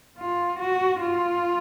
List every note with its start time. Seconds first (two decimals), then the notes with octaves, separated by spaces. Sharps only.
0.18 F4
0.60 F#4
1.01 F4